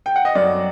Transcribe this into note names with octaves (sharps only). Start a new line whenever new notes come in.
G5
F#5
D#5
F#2 D5